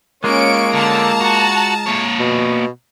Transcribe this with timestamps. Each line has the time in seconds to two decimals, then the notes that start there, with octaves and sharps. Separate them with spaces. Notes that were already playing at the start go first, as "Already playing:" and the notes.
0.24 G#3 A#3 C#4 F4 C#6 D7
0.73 D3 A5 A#5
1.21 F#4
1.86 A#2 C#5
2.19 B2